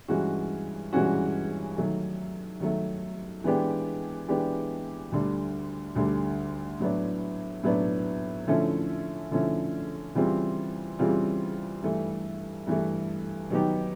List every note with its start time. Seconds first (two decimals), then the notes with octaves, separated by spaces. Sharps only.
0.08 G2 E3 G#3 C#4 F#4
0.93 G2 E3 G#3 C#4 F#4
1.77 D#3 F#3 A3
2.60 D#3 F#3 A3
3.44 E3 G#3 B3 D4 G4
4.28 E3 G#3 B3 D4 G4
5.12 D2 D3 G3
5.96 D2 D3 G3
6.80 A2 F#3 B3 D4
7.63 A2 F#3 B3 D4
8.47 D3 F3 A3 C#4 E4
9.31 D3 F3 A3 C#4 E4
10.15 C#3 E3 G3 C4 F4
10.99 C#3 E3 G3 C4 F4
11.83 G2 E3 A3
12.66 G2 E3 A3
13.50 D#3 F#3 B3 D#4 G4